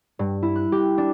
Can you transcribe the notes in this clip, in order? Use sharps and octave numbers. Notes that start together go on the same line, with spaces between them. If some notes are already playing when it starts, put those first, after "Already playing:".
G2
E4
F#6
G4
D4